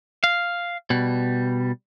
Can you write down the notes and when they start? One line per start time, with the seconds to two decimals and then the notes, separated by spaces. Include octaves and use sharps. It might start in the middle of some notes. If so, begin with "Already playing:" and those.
0.24 F5
0.90 B2 G3